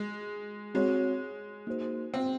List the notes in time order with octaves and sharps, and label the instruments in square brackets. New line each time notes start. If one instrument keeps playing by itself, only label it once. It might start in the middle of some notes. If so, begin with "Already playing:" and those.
Already playing: [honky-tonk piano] G#3
[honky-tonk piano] G#3 [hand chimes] C4 F#4 C#5
[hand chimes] A#3 D#4 F#4 C5
[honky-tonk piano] C4